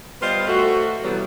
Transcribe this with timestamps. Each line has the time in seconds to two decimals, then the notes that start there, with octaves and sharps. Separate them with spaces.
0.22 G3 B3 F4 C5 D#5
0.48 A3 F#4
1.03 C3 E3 F#3 G3 B3